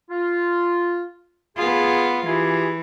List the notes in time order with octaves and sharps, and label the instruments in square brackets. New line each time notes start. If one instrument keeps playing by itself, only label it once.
[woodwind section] F4
[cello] B3 F4 [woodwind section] G#4
[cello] E3 [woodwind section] F4 G4 G#4